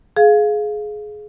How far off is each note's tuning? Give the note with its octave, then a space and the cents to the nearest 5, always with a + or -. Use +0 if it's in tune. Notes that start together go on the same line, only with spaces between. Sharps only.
G#4 +20 F5 +0